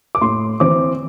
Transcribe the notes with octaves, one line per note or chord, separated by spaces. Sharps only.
D6
A2 C6
E3 C4 D6